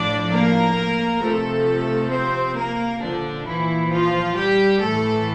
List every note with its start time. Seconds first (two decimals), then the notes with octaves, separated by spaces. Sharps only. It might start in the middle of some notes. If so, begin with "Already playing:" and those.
Already playing: A2 F3 D4 D5
0.31 A#3 A#4
1.21 C3 F3 A3 A4
2.11 C4 C5
2.56 A#3 A#4
3.01 A#2 D3 F3 D4
3.46 E3 E4
3.91 F3 F4
4.36 G3 G4
4.81 A2 E3 A3 A4